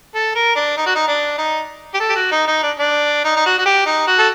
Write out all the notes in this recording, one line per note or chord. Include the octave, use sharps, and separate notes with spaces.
A4
A#4
D4
D#4
F#4
D#4
D4
D#4
G4
A4
G4
F#4
D#4
D#4
D4
D4
D#4
D#4
F#4
F#4
G4
D#4
F#4
A4